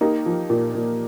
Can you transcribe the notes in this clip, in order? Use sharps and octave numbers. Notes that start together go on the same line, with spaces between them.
A#3 D#4 G4
F3
A#2
A#2